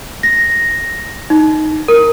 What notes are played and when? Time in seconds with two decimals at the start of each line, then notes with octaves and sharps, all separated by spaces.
0.23 A#6
1.30 D#4
1.88 A#4